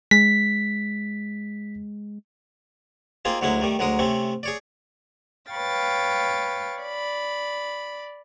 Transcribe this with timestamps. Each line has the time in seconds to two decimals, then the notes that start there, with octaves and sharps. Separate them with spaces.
0.11 G#3 B6
3.25 A#3 C4 D#4 F4 G#4
3.41 D2 F#3 G#3 D#4 E4
3.61 D#3 G3 A3
3.79 D2 F#3 G#3 A#4 D#6
3.99 C3 A3 C4 C#4
4.43 G#4 C#5 D5
5.52 B4 C#5 F5 G5 A6
6.81 D5 B5